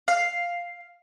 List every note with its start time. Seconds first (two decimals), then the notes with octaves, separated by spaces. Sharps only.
0.08 F5